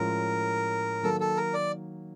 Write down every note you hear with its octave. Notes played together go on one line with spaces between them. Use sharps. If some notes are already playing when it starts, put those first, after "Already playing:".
Already playing: A2 F3 G#3 C#4 F4 A#4
D#3 F#3 A#3 A4
A4
A#4
D5